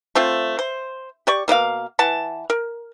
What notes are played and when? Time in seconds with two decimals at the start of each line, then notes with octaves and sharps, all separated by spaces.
0.15 A3 C4 F4
0.59 C5
1.27 G4 D5 C#6
1.48 B2 A#3 D#4 F5
1.99 E3 F#5 A5
2.50 A#4